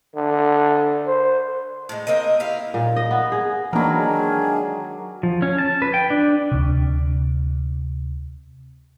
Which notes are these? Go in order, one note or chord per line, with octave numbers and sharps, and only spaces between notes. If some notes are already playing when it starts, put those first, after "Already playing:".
D3
C5
A2 G#3
A#3 C4 A#4 D#5
E4 G4 F5
A#2
D#5
B3
G#4
D#3 E3 F#3 G#3 A#3 D4 A#4 B5
G#4
F3
C#4
A5
B4
G5
D4
D2 C3